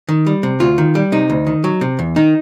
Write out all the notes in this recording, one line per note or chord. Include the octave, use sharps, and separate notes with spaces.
D#3
G3
C3
D2 F4
D#3
G3
C3 D#4
D2
D#3
F#3
C3
E2
D#3 D#4